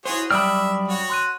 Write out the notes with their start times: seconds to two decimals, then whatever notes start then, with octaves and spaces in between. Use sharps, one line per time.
0.05 E4 F#4 G#4 C5 C#5
0.31 F#2 G3 D5 E5 G5 B5 D#6 F6
0.88 F#4 C#5
1.10 C6 F#6 D#7